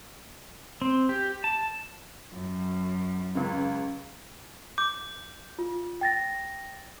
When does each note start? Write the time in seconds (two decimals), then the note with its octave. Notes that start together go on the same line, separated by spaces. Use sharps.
0.82 C4
1.09 G4
1.44 A5
2.32 F#2
3.35 C#2 C#3
4.78 D6 G6
5.59 F4
6.01 G5 A6 A#6